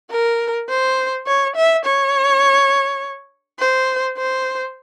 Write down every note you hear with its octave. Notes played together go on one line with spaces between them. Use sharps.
A#4
C5
C#5
E5
C#5
C5
C5